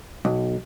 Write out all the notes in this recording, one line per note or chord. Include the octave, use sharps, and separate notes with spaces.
B1